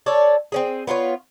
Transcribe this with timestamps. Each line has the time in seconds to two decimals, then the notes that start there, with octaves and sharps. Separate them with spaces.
0.06 A4 C#5 D5
0.52 C4 C#4 G#4
0.87 B3 F4 A#4 C#5